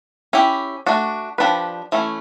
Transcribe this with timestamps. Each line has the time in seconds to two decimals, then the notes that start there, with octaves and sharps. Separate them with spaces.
0.33 C#4 E4 G4
0.86 A3 D4 F#4
1.38 F3 A3 D4 G4 B4
1.92 E3 A3 C#4